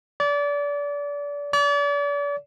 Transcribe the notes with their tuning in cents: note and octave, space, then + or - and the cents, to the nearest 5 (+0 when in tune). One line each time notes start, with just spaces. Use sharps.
D5 -30
D5 -40